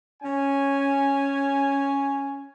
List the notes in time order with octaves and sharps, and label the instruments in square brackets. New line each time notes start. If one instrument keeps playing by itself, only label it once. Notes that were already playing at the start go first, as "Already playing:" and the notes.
[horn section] C#4 G#5